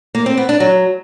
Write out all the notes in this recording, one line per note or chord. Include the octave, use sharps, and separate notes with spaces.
A#3
C4
B3
D4
F#3